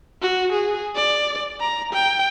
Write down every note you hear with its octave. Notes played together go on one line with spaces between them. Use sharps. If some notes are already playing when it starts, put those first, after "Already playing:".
F#4
G#4
D5
A#5
G5